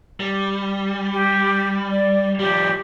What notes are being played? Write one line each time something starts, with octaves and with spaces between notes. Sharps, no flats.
G3
G4
D5
F3 G3 G4